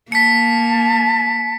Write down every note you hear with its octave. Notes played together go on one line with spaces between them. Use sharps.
A#3 A5 B6 C#7